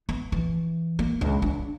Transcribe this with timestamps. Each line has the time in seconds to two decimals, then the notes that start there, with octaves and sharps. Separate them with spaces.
0.09 B3
0.32 E3
0.99 A#3
1.21 C#2
1.42 D4